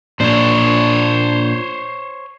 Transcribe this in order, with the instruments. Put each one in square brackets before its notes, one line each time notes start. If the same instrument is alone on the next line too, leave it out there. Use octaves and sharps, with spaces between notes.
[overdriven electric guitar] A#2 D4 [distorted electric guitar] C5 C#5